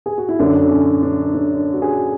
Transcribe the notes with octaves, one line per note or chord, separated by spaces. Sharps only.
G#4
F#4
E4
F#2 D3 D4
C#4
D4
D4
F#4
G#4